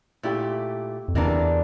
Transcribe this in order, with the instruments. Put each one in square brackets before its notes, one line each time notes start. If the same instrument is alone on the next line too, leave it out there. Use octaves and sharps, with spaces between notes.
[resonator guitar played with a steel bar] A#2 A3 E4 G4
[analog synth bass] F2
[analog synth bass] E2 [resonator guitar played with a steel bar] C3 E3 A#3 D4